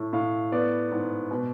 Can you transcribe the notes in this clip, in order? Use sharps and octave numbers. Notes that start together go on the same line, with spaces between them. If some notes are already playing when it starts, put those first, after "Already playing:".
Already playing: A2
A2 F5
B3 D5
G#2
B2